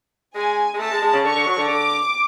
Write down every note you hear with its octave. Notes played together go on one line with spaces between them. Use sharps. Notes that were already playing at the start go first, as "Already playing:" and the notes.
G#3 G#5
G#3
A3 A5
G#3
G#3
C#3
D3 C#6
D3
F#3
D3
D3 D6